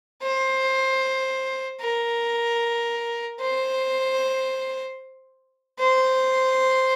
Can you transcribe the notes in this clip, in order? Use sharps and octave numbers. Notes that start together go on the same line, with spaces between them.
C5
A#4
C5
C5